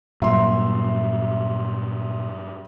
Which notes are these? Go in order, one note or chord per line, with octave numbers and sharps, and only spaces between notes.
G2 A#2 F#3 E5 C6